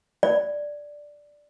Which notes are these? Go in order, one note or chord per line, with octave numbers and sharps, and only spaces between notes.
D5